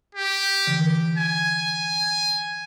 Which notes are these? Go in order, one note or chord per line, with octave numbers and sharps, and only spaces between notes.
G4
D3 E3
G#5